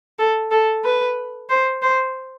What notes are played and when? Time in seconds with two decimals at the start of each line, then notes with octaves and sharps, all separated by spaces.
0.19 A4
0.51 A4
0.84 B4
1.49 C5
1.82 C5